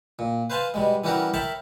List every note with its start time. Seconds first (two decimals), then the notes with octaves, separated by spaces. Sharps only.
0.19 A#2
0.50 B4 C5 F5 G#5 A5 C6
0.74 B2 G3 G#3
1.04 E3 G3 C#4 F#4 G4 A#4
1.34 A#4 C#5 E5 G5 A5 B5